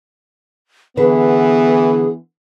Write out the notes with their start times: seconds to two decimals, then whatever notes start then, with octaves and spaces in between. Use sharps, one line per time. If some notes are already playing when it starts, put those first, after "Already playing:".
0.97 D3 E3 B3 G#4 B4